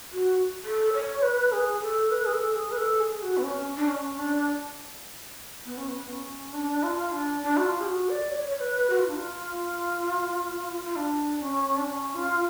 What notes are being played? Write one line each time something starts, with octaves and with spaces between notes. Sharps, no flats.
F#4
A4
C#5
B4
G#4
A4
B4
G#4
A4
G#4
B4
A4
G#4
F#4
B3
C#4
D4
C#4
D4
B3
C#4
B3
C#4
D4
F4
D4
D4
F#4
F4
G#4
F#4
D5
C#5
C#5
B4
F#4
F4
D4
F4
F4
D4
C#4
D4
C#4
F4